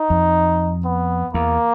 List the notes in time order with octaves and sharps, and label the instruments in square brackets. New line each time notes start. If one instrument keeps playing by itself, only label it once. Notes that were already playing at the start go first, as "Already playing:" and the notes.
Already playing: [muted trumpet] D#4
[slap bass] F2
[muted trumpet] B3
[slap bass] E2 [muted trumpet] A#3